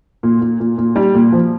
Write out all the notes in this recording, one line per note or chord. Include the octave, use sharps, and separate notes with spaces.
A#2
A#2
A#2
A#2
G3
A#2
F3